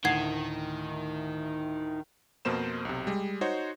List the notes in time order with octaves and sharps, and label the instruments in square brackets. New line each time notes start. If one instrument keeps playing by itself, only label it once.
[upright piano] D2 A2 [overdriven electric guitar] D#3 [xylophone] F#5 G#6 C7
[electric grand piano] F2 B2 A#3 C5 E7
B1 C3
G3 G#3
D#4 F#4 C5 C#5